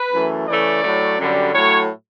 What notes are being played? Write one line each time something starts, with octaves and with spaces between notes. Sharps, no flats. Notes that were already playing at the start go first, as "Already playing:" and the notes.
Already playing: B4
F#2 E3 A3
C#3 E3 A3 D5
A2 F#3 A3
F#2 D3 G3
A2 F#3 A3 C#5